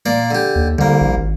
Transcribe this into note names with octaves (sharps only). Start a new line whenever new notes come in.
A#2 A#3 D5
D3 G4
D#2
C2 D3 A#3
A#1
G#1